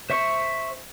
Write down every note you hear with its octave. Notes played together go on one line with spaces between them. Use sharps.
C5 E5 C#6